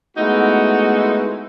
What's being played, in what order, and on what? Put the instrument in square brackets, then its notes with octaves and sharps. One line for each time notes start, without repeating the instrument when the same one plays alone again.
[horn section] G#3 A3 B3 D#4 E4 F#4